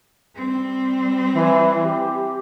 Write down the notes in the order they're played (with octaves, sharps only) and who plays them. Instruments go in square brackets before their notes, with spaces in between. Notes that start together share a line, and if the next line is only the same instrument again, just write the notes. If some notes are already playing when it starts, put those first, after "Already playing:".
[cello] G3 C4
[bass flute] E3
G4